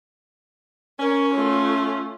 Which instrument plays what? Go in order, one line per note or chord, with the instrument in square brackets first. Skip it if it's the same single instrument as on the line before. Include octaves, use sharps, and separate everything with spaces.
[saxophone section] C#4 [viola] A#4 C#5
[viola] A3 F4